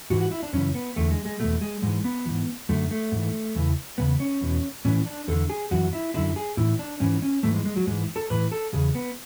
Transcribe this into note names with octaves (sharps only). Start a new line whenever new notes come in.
G#2 E3 F#4
F#4
E4
D4
F#2 C#3 E3 C#4
B3
E2 D3 A3
G#3
G#3
E2 B2 A3
G#3
G#2 E3 G#3
B3
G#2 E3
F#2 D3 A3
A3
G#2 E3
E2 C#3 E3
E2 C#3 B3
C#4
E2 B2
A2 E3 C#4
D4
E2 D3 A4
G#4
F#2 E3 F#4
E4
F#2 D3 E4
G#4
A2 E3 E4
D4
G#2 E3 C#4
C#4
G#2 E3 A3
G#3
G#3
F#3
G#2 E3 G#3
A4
A2 E3 B4
A4
E2 C#3 G#4
B3